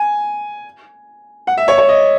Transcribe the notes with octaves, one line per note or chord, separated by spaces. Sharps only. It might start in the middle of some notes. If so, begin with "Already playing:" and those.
Already playing: G#5
F#5
E5
C#5
C#5
D#5